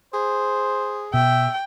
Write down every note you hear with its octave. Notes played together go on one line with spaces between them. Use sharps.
G#4 C5
B2 E5 G5